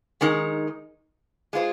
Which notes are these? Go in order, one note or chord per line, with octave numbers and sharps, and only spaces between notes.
D#3 G#3 D#4 A#4
G#3 F4 C5